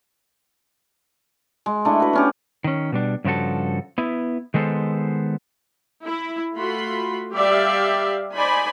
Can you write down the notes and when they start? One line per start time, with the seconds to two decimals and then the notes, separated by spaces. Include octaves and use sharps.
1.66 G#3
1.85 A3 D4 E4
2.00 F#4 B4
2.13 B3 C#4 G4
2.64 D#3 C#4
2.92 B2 G3 D4
3.24 G2 C#3 F3 F#4 A4
3.98 B3 E4
4.54 D#3 G#3 B3 A4 C5
6.05 E4
6.56 A3 F4 F#4 B5 C6
7.33 G3 G4 D5 E5 F5
8.35 D#4 C5 D5 G#5 B5